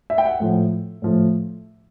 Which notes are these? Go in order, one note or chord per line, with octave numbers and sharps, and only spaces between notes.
E5
G5
F#5
A2 F3 A3
A2 F3 A3